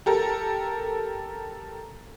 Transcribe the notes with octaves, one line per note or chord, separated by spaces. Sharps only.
G4 A4 A#4